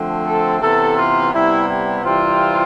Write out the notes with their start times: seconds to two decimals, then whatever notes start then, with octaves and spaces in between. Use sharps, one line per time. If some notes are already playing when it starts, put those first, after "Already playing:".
Already playing: D3 F3 A3 C4
0.26 A4
0.61 C3 E3 B3 A4
0.98 F4
1.33 C3 G3 B3 E4
1.69 E4
2.05 C3 E3 G3 C4 F4